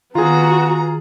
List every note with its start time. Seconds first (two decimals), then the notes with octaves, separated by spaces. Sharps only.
0.15 D#3 B3 F4 F#4 G#4 A#5